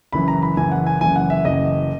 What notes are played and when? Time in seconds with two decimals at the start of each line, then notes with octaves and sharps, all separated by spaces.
0.13 F#1 F#2 E3 B5
0.28 A#5
0.42 B5
0.57 F#1 F#2 E3 G#5
0.72 F#5
0.87 G#5
1.01 F#1 F#2 E3 G#5
1.16 F#5
1.30 E5
1.45 F#1 F#2 E3 D#5